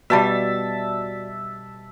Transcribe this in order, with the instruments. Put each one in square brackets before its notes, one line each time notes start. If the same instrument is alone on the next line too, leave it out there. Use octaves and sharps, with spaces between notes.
[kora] B2 G3 [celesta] F#4 D5 [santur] E5 A5